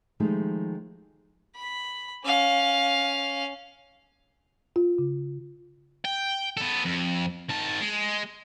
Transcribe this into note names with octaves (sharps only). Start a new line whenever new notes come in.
D#3 F3 G#3 A3 D#4 G4
B5
C#4 F5
F4
C#3
G5
B3 A4
F2
D#3 A5
G#3